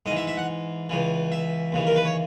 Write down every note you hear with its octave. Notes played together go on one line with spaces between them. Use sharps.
G#2 E3 D#5
E5
E5
F#5
C#2 C#3 E3
E5
D#2 C#3 E3
A#4
B4
C#5